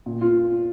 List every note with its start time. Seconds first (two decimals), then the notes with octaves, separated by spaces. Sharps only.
0.06 A#2
0.21 F4